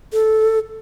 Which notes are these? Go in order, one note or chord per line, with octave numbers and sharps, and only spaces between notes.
A4